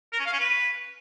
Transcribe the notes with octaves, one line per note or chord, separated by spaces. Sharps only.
A#4
C#4
F5
C#4
B4